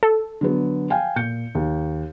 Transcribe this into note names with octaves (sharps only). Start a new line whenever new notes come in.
A4
D3 F#3 B3
F5 G5 G#5
A#2 G6 C#7
D#2